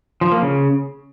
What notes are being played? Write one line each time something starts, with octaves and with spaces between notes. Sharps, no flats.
F3
A#3
C#3